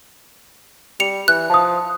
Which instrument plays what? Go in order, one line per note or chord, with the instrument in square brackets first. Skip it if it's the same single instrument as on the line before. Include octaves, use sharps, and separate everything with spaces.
[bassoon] G3 [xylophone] C#7 F7
[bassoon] E3 [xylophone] F#6
[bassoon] F3 [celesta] A5 D#6